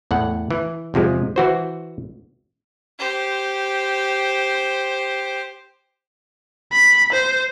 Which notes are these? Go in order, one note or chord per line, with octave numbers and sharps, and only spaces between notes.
E2 A2 F#5
E3
E2 C3 F3 G#3
E3 F#4 C5
G4 C5
B5
C5